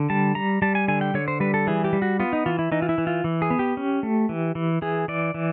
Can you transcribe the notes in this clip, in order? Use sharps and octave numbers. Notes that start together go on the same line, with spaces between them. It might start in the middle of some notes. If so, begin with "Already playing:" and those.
Already playing: D3
G3 A5
G3 A#5
G3 A5
G#5
D3 G#5
G5
D3 C#5
C5
G3 B4
A4
E3 G#4
G4
G3
F#4
B3 F4
D#4
E3 F4
E4
E3 D#4
F4
E4
E3
F4
E3
G#4
B3
G4
C#4
A3
E3
E3
E3 G#4
E3 D5
E3